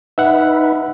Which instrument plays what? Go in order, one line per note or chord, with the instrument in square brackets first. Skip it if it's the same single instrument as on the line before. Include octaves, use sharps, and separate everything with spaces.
[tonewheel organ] D#4 B4 [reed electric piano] E5 F#5